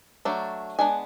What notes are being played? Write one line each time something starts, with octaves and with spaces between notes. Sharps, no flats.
F#3 A3 D4
G#3 B3 D4 G#5